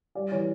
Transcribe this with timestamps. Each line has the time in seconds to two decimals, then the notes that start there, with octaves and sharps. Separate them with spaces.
0.15 G3 D5
0.32 E3 C#5